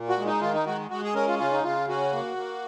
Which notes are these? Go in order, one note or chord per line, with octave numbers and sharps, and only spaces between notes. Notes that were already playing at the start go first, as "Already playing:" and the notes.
Already playing: A#2
F#4
G#3
D#4
D#3 F4
D#4
G#3 F#4
G#3 F#4
G#4
C#4 A#4
F4
C#3 F4
D#4
C#3 F4
C#4 F#4
A#3
A#3